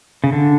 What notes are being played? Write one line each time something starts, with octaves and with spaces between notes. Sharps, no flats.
C#3
D3